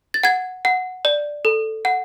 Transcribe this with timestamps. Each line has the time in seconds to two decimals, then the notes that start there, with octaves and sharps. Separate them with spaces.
0.14 A6
0.23 F#5 G#6
0.65 F#5
1.05 D5
1.45 A4
1.85 F#5